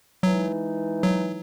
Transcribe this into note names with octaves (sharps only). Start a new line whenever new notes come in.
E3 F#3 G#3 D#4
F#3